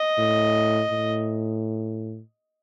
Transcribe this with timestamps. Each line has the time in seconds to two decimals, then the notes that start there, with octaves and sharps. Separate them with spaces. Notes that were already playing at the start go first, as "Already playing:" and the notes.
Already playing: D#5
0.18 A2
0.91 A2